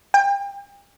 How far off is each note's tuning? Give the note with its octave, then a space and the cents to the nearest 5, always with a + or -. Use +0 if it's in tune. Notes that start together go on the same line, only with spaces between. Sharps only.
G5 +35